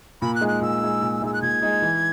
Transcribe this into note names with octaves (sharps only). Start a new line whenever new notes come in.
A#2 B5
F#6
G#3 D#4 G#4
F#6
A#2 E6
G#3 D#4 G#4
A#2
G#3 D#4 G#4 E6
F#6
A#2 G#6
G#3 D#4 G#4
E3